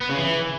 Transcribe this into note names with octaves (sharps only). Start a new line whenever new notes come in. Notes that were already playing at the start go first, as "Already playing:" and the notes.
B3
C#3
E3